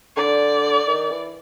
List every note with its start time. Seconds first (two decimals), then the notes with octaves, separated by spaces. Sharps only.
0.17 D3 D5
0.88 D#3
1.11 E3